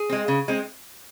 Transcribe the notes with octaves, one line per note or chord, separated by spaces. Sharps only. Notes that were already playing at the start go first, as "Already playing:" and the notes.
Already playing: G#4
G#3 C4
C#3
G#3 C4